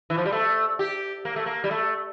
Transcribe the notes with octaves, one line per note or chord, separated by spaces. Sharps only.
E3
F3
G3
A3
G4
A#3
A3
A#3
G3
A3